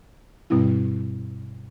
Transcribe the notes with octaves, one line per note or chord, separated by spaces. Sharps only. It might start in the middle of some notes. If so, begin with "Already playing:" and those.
G2 B2 G3 C4 E4